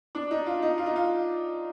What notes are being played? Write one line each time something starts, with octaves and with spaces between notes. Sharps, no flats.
D4
D#4
F4
D#4
F4
D#4
F4